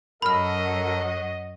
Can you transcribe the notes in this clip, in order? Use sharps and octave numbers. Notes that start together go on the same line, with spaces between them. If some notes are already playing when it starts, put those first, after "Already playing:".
F#2 F#3 A4 A#4 D#5 A#5 B5 F6